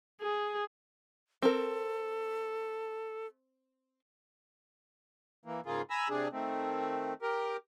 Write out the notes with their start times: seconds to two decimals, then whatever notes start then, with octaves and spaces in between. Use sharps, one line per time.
0.21 G#4
1.42 C4 A4 A#4
5.46 E3 A#3
5.66 G#2 C#3 A#3 F4 G#4
5.90 G#5 A#5 B5 E6
6.09 C3 D4 G#4
6.32 D#3 A3 C4
7.22 G4 A#4